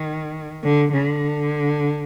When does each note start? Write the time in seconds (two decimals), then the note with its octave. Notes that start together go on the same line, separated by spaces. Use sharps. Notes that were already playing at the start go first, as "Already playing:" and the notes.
Already playing: D#3
0.64 D3
0.93 D3